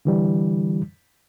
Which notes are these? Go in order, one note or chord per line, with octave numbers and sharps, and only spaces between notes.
D3 E3 G3